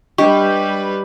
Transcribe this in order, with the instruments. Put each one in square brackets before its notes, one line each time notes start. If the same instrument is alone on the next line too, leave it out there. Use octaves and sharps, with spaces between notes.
[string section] G3 B4 [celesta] D4 C#6 [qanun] G4 [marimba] D#5